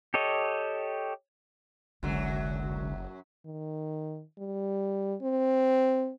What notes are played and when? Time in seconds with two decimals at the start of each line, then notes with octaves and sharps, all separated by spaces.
0.14 G4 A4 C#5 D#5
2.03 F#1 C2 F#2 D3 F#3 G#3
3.46 D#3
4.38 G3
5.22 C4